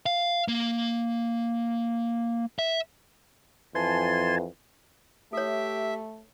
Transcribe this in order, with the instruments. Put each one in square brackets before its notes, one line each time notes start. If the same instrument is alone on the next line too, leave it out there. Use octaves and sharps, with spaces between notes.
[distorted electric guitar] F5
A#3
E5
[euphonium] F2 [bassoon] E3 [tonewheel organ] G#5 A5 [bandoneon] C6
[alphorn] A3 [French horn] G4 [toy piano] A4 C#5 [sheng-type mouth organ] E5